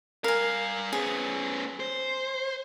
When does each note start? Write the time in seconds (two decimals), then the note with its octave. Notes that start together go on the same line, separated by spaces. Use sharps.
0.24 G2 A#4 F5 G#5
0.93 B3 C#4 G#4
1.80 C5